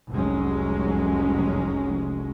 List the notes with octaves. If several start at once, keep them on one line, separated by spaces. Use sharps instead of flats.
F1 C2 F2 F#3 G#3 C#4